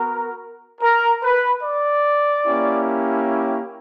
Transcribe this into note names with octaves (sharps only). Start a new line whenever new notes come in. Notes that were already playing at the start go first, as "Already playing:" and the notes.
Already playing: B3 F#4 A#4
A#4
B4
D5
A#3 C#4 E4 G4